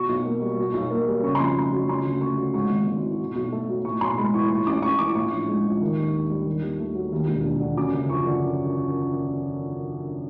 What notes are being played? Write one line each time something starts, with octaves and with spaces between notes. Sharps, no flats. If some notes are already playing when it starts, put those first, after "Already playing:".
Already playing: B2 C#6
B1
A#3
G3
B2
B1
A#3
G3
C#3 C#6
F2 C6
B5
A3 C6
F#3
C#3 C6
D2
A3 C#6
F#3
G#2 C#6
G#1
G#1
E3
B2
B1
A3
F#3
A2 C#6
B1 C6
G#3 B5
E3 C#6
A2 C#6
A1 D6
A1 C#6
E3 D6
A2 C#6
A#1
G#3
F3
D#3
D#2
D#2
G3
D#3
D#2
A3
F#3
D#2
E1
E1
D3
F#2 D6
F#1
F3 C#6
D3